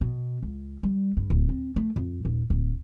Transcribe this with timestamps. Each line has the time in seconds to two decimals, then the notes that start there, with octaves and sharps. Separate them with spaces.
0.01 B2
0.43 C#2
0.83 G3
1.17 G2
1.30 D1
1.49 C4
1.76 A3
1.96 F2
2.25 D#1
2.50 D1